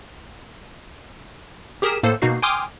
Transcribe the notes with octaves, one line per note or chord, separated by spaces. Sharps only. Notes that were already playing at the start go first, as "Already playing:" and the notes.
G4 G#4 A#4 D#6 B6 E7
A2 A#3 A4 C5 E6
B2 A#3 D#4 F#4 C7
G5 G#5 C6 D6 D#6 F6